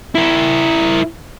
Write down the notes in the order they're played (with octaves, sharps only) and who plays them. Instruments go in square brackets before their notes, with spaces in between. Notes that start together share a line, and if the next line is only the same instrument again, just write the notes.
[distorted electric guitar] E4 A#4